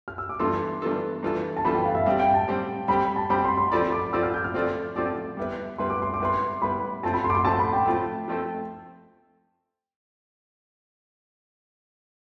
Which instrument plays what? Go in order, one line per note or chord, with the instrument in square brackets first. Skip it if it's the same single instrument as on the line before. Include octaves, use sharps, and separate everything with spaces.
[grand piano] F6
E6
D6
[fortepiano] G2 E3 B3 F4 A4 [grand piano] C6
[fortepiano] G2 E3 B3 F4 A4
G2 E3 B3 F4 A4
[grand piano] A5
[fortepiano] G2 E3 B3 F4 A4 [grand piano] B5
[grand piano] G5
F5
E5
[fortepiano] G3 C4 G4 [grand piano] F5
[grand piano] G5
A5
[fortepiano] G3 C4 G4
[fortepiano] G3 C4 G4 [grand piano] B5
[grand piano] A5
[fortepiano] G3 C4 G4 [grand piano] B5
[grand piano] C6
C6
[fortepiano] F3 C4 F4 A4 D5 [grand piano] B5
[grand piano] D6
[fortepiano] F3 C4 F4 A4 D5 [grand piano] E6
[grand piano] F6
G6
F6
[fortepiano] F3 C4 F4 A4 D5
[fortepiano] F3 C4 F4 A4 D5 [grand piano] D6
[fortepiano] G3 B3 E4 B4
[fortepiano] G3 B3 E4 B4 [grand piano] C6
[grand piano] D6
C6
D6
[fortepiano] G3 B3 E4 B4 [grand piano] C6
[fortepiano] G3 B3 E4 B4 [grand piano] B5
[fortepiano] F3 A3 C4 F4 A4 [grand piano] A5
[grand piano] B5
C6
D6
C6
[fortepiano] F3 A3 C4 F4 A4 [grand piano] A5
[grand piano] B5
G5
[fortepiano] F3 A3 C4 F4 A4
F3 A3 C4 F4 A4